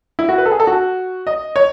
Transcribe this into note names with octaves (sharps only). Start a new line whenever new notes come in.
E4
F#4
B4
A4
G#4
A4
F#4
D#5
C#5